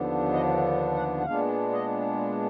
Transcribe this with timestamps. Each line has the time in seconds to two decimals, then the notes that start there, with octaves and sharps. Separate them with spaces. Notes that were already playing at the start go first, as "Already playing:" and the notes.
Already playing: D#2 D3 F3 B3 D4
0.33 D#5
0.95 F#5
1.21 F#5
1.25 A#2 G#3 B3 D4 F5
1.72 D#5